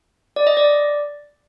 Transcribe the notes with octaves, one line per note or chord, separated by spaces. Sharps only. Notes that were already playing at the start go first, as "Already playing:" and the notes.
D5
D#5
D5